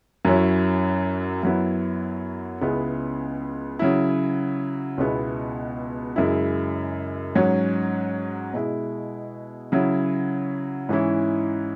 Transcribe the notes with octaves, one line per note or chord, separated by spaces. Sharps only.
F#2 F#3 C#4 E4
F#2 F#3 B3 E4
C#2 C#3 G#3 B3 E4
C#3 F#3 E4
C#2 B2 G#3 B3 E4
F#2 C#3 G#3 E4
G#2 F#3 C#4
B2 G#3 E4
C#3 F#3 E4
G#2 E3 C#4 E4